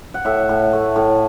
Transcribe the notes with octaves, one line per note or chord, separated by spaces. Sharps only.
F#5
A2 E5
A2
A3
A2